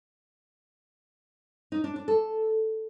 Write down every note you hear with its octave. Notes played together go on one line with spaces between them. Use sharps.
D#4
D4
D4
A4